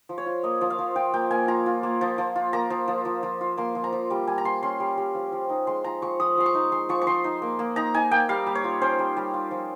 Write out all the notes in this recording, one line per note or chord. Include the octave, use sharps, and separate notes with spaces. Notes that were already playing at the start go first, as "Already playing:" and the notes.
F3
C#5
F4
A#3 D#5
F3
F5
F3
F4 G5
A#3 G5
A#3 G#5
F4 A#5
F4
A#3
F3
F3
F4
A#3 A#5
F3
F3
F3
F3
F4
A#3 C6
F3
A#5
F3
G3
G3 G#5
A#5
F4 C6
C#4 C6
G3
G3
F3
F3
D#4
G#3 C6
F3 A#5
F3 C#6
F3 D#6
F3 C6
C#6
D#4
G#3 C6
F3 C#6
C#6
F3 C6
D#4
A#3
A#3
D#4 A#5
D#4 G#5
A#3 G5
G3 F5
G3
C#5
F4
C#4 C5
G3
G3
F4
F3